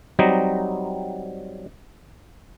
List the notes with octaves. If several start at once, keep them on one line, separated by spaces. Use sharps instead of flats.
F#3 G3 C4 D#4 D#5